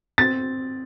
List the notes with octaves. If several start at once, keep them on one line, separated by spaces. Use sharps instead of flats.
C4 A6